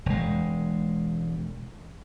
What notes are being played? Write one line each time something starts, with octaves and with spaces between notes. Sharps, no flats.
E1 G#3